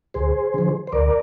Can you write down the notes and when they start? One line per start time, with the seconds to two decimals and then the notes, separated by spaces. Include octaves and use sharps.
0.14 D2 G#4 C5
0.54 D3 F3
0.87 C5
0.92 D2 A#4 D5